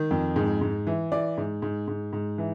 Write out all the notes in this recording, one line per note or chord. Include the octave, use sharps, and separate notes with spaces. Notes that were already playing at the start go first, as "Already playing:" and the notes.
Already playing: D#3
F2
G#2
G#2
E3
E3 D5
G#2
G#2
G#2
G#2
E3